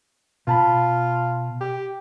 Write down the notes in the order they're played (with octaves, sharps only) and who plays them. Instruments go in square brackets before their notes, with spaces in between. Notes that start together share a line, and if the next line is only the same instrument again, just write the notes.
[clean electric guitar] B2 A5 B5 [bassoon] F4
[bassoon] G4